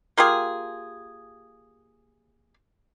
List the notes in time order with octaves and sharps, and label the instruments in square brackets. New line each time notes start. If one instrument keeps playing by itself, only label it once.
[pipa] A#3 F4 G4 G#4